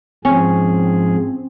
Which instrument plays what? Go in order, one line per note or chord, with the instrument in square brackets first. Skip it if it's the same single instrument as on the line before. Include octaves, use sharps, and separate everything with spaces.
[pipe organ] G#2 F3 G#4 [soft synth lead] C4 [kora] C#4